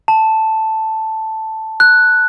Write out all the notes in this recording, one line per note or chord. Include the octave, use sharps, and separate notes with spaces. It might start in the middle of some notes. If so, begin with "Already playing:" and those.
A5
F#6